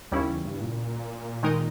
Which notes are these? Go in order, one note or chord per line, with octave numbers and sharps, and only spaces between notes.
D#2 C#3 G3 C#4 E4
E2
G2
A#2
D#3 G#3 D#4 A#4 D#5